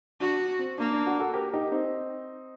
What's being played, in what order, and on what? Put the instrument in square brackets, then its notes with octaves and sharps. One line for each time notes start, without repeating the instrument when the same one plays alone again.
[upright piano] D4 [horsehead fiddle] F#4
[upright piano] C4
[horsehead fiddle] A#3 [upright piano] D4
[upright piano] D4
D4 F#4
F#4 A4
G4 A#4
D#4 G4
C4 D#4